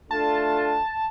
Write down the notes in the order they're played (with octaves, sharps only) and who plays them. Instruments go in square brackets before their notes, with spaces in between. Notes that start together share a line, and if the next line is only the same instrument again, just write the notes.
[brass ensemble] A3 D4 F4 [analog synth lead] A5